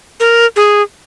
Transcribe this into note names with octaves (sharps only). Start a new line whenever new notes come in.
A#4
G#4